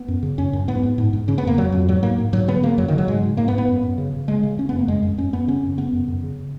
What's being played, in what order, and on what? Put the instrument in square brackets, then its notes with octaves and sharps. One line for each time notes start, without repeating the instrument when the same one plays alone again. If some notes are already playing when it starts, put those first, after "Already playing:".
Already playing: [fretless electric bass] B3
F#2
C#3
F#2 C#4
F#2
G#2 B3
G#2
G#2
G#2
C#3 C#4
B3
F2 A#3
F2 F#3
F2
G#2 F#3
G#2 A#3
G#2
G#2 F#3
C#3 B3
C#3 A#3
F#2 F#3
D#3
C#3
F#3
G#2 G#3
G#2
G#2 A#3
B3
G#2
B3
F#2
F#2
C#3
C#3
C#3 G#3
C#3
C#3 C#4
F#2 B3
A#3
F#2 G#3
F#2
F#2 C#4
F#2 B3
C#3 C#4
F#2
C#3 B3
F#2
F#2
C#3